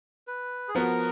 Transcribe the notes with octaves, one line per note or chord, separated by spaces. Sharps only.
B4
G#4
F3 B3 F#4 A#4